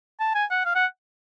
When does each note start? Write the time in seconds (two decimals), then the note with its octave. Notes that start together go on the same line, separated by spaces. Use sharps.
0.20 A5
0.35 G#5
0.50 F#5
0.65 F5
0.75 F#5